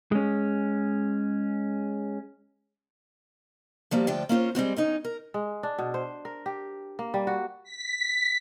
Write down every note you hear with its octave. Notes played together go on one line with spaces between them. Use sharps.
G#3 C#4
F3 G3 A#3 F#4
D2 F3 D4 G5
A#3 C#4 F4 C5
G3 G#3 C4 F#4
D#3 C#4 D#4
A#4
G#3
D4
B2
C5
A#4
G4
A#3
G3
F#4
B6